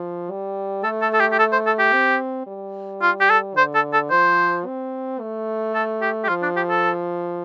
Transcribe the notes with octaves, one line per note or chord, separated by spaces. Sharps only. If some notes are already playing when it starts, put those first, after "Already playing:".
Already playing: F3
G3
A3 A4
A4
A4
G4
G4
A4
C5
A4
G4
C4
G3
F4
G4
A4
D3 C5
A4
A4
F3 C5
C4
A3
A4
G4
G4
F3 F4
D4
G4
A4